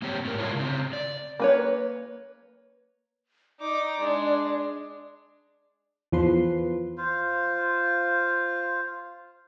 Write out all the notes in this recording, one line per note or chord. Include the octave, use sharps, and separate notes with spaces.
A#3 C4 G4 C#5
A2 A#4
F#3 G#3 D4 E4 F4 C#5
C#3 C4
D5
A#3 B4 C#5
D#4 D5 D6
G#3 D4
E2 F3 B4 C6
F4 C5 F5